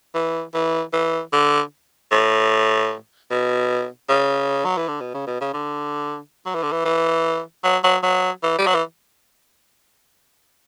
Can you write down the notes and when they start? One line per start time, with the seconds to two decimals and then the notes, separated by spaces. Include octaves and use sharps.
0.15 E3
0.54 E3
0.93 E3
1.33 D3
2.12 A2
3.31 B2
4.09 C#3
4.65 F#3
4.77 E3
4.88 D3
5.01 B2
5.14 C#3
5.27 B2
5.41 C#3
5.54 D3
6.46 F#3
6.54 E3
6.63 D3
6.71 E3
6.85 E3
7.64 F#3
7.84 F#3
8.03 F#3
8.43 E3
8.58 G3
8.66 F#3
8.74 E3